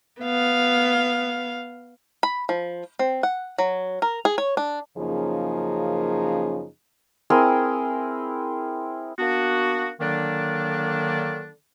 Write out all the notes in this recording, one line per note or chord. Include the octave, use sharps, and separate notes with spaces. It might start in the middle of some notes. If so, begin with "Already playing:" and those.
B3 F5
B5
F3
C4
F#5
F#3
A#4
G#4
C#5
D4
F#2 C#3 F3 A#3 D#4 G#4
C4 E4 G#4 A#4
A#3 B3 D4 F#4
D3 D#3 F#3 A#3 D4